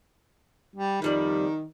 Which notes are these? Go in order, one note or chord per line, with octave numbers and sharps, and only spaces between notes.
G3
F2 D#3 G3 D5